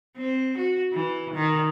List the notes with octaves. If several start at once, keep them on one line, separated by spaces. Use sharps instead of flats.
C4
F#4
E3
D#3